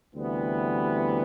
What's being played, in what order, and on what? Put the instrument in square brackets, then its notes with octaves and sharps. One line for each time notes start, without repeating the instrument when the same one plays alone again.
[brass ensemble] D2 C3 E3 G3 B3